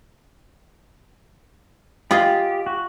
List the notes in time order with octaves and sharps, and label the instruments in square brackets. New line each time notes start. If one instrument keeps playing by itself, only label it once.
[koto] F4 G#4 D#5 [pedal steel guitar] G4
[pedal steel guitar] F#4